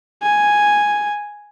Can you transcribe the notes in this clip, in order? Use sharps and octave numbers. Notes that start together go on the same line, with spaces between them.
G#5